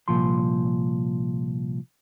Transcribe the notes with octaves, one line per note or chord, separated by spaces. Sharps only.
C2 A#2 F3 C6